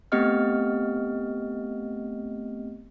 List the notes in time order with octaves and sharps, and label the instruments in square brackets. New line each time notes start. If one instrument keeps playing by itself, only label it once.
[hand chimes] A3 B3 C4 G4 D#5 F6